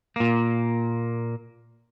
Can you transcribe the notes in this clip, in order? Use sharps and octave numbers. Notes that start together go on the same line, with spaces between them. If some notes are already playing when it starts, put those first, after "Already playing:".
A#2 A#3